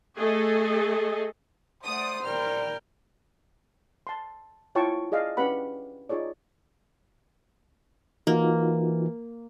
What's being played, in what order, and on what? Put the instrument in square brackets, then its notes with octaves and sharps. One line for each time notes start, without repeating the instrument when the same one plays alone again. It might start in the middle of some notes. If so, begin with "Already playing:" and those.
[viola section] A3 G#4 A4 D#5
[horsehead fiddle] A3 [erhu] C5 [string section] D5 F#5 D#6
[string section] A#2 G3 F6 [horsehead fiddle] A#4 G5
[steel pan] A5 C6
E4 F4 C#5 G5 A5 C#6
G#4 D5 D#5 F5
C#4 D4 G4 B4 F#5 B5
D#4 F4 G#4 C#5 D5
[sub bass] E3 [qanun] A#3 [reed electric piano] D#4 F4 F#4